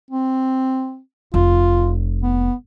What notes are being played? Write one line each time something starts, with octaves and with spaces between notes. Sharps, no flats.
C4
F1 F4
B3